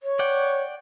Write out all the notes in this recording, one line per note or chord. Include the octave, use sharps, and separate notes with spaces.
C#5
D5 F#5 G5